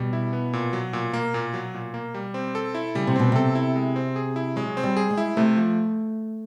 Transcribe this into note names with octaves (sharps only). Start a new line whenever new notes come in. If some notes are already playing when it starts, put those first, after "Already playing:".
Already playing: B2 G3
E4
B3
A#2
F#3
A#2
A#3
A#2
F#3
A#2
A#3
G3
C4
A4
E4
C#3 G3
C3
B2 C4
C3 A4
E4
G#3
C4
G#4
E4
F#3 G#3
C4
G3
G#4
G#3
E4
C3 A3
F3